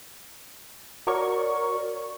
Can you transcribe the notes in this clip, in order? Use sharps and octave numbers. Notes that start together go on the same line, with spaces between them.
F#4 A#4 C#5 D5 C#6